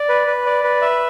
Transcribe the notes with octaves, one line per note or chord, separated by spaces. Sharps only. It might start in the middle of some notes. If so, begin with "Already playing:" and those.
Already playing: D5
B4
B4
D5
B4
E5